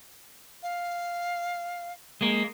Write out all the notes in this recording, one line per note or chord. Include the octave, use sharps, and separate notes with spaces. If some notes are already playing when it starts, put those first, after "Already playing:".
F5
G#3 A#3